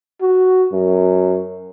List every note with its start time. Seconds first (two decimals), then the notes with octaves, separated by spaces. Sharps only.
0.21 F#4
0.72 F#2